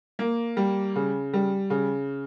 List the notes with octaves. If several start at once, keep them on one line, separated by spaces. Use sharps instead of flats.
A#3
G3
C#3
G3
C#3